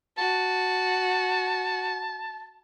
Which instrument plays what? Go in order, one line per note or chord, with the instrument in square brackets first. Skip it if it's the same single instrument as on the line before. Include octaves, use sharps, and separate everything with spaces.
[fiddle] F#4 [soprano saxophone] A5